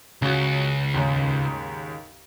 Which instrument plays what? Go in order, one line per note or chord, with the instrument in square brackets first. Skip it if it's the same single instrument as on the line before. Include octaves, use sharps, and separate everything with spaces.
[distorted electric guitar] C#2 [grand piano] C#3 F#4
[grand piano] D#2 G#2 C#3